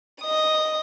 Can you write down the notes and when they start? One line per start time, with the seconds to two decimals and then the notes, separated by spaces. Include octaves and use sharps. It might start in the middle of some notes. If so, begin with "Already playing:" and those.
0.22 D#5 D#6